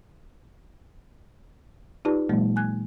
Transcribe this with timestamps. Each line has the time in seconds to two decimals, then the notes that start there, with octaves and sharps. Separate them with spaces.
2.05 D#4 F4 G4 B4 D5 A5
2.29 A#2 E3 F#3 G#3 A#3
2.56 G#5 F#6 G#6